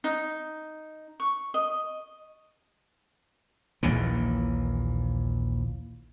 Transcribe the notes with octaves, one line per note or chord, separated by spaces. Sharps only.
D#4
C#6
D#5
A#1 D#2 A#2 E3